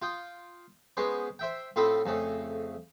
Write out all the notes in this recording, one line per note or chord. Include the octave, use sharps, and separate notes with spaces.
F4 G5 D#6
G#3 B3 C#4 B4 C5
C5 E5 G5
A2 C4 F4 A4 B5 D#6
F2 C#3 A3